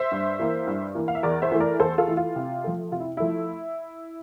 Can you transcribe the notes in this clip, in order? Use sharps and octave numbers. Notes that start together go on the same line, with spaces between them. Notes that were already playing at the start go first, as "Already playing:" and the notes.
Already playing: C5 E5
G2
E3 A#3
G2
E3 A#3
F5
E5
E2 A#4 D5
C5 E5
E3 A3
A#4 D5
E2 A4 C5
F4 A4
E3 A3
F4
C3
F3 A3
C3 F4
E4
F3 A3 E4